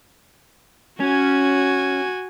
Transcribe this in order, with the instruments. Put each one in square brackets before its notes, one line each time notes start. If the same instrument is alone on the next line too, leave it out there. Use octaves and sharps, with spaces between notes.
[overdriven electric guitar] C#4 [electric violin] F#4 G#5